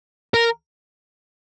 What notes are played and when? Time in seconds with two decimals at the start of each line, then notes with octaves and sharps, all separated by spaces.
0.34 A#4